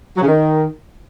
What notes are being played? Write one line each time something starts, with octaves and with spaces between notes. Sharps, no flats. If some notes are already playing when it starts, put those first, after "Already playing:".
F#3
C#3
D#3